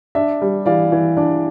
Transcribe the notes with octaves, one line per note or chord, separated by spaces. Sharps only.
D4 E5
G3
E3 D5 F5
E3
D4